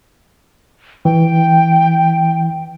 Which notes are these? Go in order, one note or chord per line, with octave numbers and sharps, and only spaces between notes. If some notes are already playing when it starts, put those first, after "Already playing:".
E3 G5